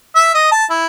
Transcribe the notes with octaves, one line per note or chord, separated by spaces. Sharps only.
E5
D#5
A5
E4